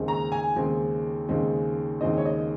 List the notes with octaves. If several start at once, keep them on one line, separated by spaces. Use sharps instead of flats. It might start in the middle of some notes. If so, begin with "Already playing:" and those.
Already playing: D#2 C#3 G#3 C4 D#4
A#5
G#5
D#2 C#3 G#3 C4 D#4
D#2 C#3 G#3 C4 D#4
D#2 C#3 G#3 C4 D#4 D#5
C#5
D#5